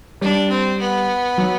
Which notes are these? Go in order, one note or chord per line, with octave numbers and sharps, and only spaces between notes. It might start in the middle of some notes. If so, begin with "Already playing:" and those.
G3 D4
C4
B3
F#3